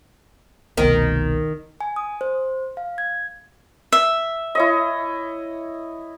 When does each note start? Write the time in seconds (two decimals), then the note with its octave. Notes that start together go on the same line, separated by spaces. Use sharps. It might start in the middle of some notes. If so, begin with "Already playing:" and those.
0.77 F1 C2 B2 D#3
1.81 G#5
1.96 D#6
2.21 C5
2.77 F5
2.98 G#6
3.92 E5
4.55 E4 C#5 D#5